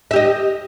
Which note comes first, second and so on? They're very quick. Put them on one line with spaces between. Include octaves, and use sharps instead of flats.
E5 G4 D#5